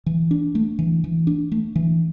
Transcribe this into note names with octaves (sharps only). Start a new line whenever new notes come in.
E3
D4
A3
E3
E3
D4
A3
E3